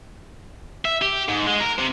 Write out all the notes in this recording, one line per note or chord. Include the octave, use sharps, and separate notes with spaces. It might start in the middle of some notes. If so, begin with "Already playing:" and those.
E5
G4
G#2
G#3
A#4
C3